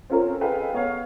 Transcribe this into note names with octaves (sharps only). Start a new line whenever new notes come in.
C4 C#4 F4 A4 A#4
G#4 A4 B4 D#5 F5 G5
B3 C#5 F5